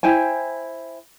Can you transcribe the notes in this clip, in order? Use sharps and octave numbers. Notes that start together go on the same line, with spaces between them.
E4 C5 G5 G#5